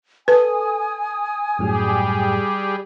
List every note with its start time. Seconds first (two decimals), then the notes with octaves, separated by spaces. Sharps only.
0.28 A4 B4 G#5 D#6
1.59 F#2 A2 F#3 G3 G4 G#4